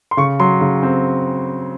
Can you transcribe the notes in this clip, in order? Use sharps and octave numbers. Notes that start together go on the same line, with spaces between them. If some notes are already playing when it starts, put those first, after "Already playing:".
C6
C#3 C#6
F#3 C6
C#3
C4